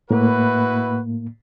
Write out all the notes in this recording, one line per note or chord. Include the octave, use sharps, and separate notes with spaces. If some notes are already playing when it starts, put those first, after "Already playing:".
A2 A#3 E4 F#4 B4